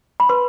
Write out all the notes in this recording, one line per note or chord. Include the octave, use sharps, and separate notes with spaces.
B5
B4 C6